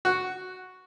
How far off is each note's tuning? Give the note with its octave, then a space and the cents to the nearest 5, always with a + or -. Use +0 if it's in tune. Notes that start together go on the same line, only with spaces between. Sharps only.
F#4 +0 F#5 +5